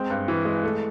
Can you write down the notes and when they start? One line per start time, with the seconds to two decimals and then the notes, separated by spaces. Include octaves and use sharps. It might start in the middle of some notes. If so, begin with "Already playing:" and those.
Already playing: G#3 C4
0.10 G2
0.28 E3
0.45 G#3
0.64 A3